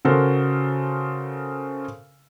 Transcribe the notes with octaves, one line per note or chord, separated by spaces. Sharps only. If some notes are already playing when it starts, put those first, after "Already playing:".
C#3 F#4 A4 A#4 C5